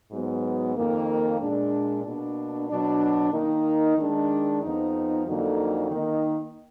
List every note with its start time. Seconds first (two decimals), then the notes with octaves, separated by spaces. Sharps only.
0.10 G#2 F#3 B3
0.75 F2 D#3 A#3
1.39 A#2 G#3 D4
2.03 B2 A#3 D4
2.68 B2 F#3 D4
3.32 D#3 A#3 D#4
3.96 D#3 G#3 D4
4.61 F2 F3 B3 D#4
5.26 F2 D3 F#3 A#3 D#4
5.90 D#3 A#3 D#4